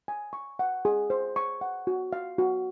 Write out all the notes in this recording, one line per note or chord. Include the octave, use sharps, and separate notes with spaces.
G#5
C#6
F#5
G#4
C5
C#6
F#5
F#4
F5
F#4